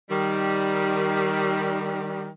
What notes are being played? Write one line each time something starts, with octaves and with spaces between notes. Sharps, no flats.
D#3 G3